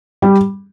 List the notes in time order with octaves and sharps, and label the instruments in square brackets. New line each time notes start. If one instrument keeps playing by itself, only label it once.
[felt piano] G3